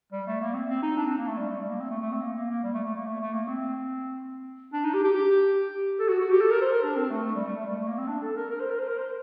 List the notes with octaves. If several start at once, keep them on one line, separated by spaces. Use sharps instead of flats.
G3
A3
A#3
C4
C4
D#4
D4
C4
A#3
A3
G3
A3
G3
A#3
C4
A3
A3
C4
A#3
A#3
A#3
G3
A3
A3
A#3
A3
A3
A#3
C4
D4
D#4
G4
G4
G4
A4
F#4
F#4
G4
A4
A#4
C5
A#4
D4
C4
A3
A3
G3
A3
A3
G3
A3
A#3
C4
D4
A4
A#4
A#4
C5
A#4
C5
A#4
C5